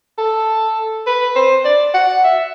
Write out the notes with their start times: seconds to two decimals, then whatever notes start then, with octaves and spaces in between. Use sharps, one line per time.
0.18 A4
1.07 B4
1.36 C5
1.65 D5
1.94 F#5
2.24 E5